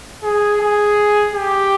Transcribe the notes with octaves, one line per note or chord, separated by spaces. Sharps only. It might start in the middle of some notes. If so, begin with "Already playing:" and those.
G#4
G#4
G4